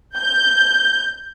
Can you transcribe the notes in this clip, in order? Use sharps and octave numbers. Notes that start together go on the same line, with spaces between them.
G6